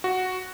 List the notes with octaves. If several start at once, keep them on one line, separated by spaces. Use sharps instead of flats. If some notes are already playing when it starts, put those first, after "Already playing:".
F#4